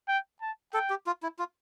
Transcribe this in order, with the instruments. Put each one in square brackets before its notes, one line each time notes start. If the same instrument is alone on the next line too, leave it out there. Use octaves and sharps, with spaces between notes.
[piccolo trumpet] G5
A5
[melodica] A4 [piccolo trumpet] G5
[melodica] G4
F4
E4
F4